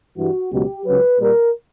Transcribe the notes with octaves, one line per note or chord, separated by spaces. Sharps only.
G2 E3 G3 F#4
C#2 B2 F#3 G4
C#2 C#3 F#3 B4
A#2 G3 A#4